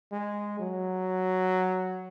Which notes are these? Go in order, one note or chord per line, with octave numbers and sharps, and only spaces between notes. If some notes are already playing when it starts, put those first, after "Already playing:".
G#3
F#3